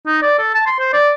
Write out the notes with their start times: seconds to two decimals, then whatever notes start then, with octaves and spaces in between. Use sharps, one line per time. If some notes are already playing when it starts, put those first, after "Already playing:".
0.07 D#4
0.22 D5
0.38 A4
0.54 A5
0.66 C6
0.79 C5
0.93 D5